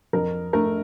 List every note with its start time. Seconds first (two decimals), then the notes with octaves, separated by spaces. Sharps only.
0.13 F2 A#4
0.53 A3 A#4